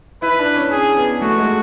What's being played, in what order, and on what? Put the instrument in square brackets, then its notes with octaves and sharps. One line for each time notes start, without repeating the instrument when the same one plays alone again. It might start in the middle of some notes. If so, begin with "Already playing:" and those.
[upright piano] E4 [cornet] B4
[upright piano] D4
C#4
[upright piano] C#4 [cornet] G#4
[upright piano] B3
[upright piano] A3 [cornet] F#4
[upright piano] G#3